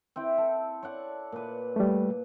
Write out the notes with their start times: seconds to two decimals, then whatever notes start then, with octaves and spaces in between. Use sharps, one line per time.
0.16 C4 E4 G5
0.38 A4
0.83 C#5 D5 F#5
1.32 A#2 B4
1.76 G3 A3